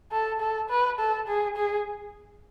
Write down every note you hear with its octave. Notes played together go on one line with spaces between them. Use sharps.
A4
A4
B4
A4
G#4
G#4